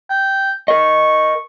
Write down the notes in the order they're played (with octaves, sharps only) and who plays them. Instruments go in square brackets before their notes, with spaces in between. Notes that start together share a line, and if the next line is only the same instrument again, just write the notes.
[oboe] G5
[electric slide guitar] A#4 D#5 [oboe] C#6